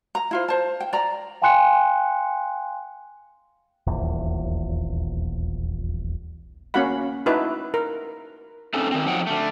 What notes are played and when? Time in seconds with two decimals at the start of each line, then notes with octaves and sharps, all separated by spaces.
0.15 A#5
0.31 E4 F4 C5
0.48 C5 A5
0.80 G5
0.93 D5 A#5
1.42 F5 G5 G#5 C6 F#6 C#7
3.87 D#1 A#1 E2
6.74 A#3 C#4 F#4 F5 F#5 B5
7.26 D#4 E4 F#4 B4 A5
7.74 A#4
8.74 A3 C4 C#4 D#4 A4
8.92 D#3 C4
9.07 F3 F#3 D#4 F#5 G5
9.27 D3 A3